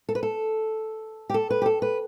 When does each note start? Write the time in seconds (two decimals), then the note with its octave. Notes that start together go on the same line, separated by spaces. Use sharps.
0.09 A4
0.15 B4
0.23 A4
1.30 G4
1.34 A4
1.50 B4
1.62 G4
1.66 A4
1.82 B4